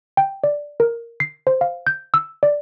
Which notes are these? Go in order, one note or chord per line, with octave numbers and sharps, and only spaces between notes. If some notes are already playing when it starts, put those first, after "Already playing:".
G5
D5
A#4
C7
C5
F5
G6
E6
D5